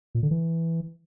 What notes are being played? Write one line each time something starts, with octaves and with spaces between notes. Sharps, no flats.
A#2
D3
E3